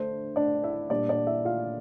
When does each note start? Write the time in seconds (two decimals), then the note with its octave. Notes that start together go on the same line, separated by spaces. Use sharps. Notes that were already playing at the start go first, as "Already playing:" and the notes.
Already playing: D3 A3 D4 C5
0.36 D4 D5
0.64 E4 E5
0.90 A#2 G3 D4 D5
1.09 D4 D5
1.27 E4 E5
1.45 F4 F5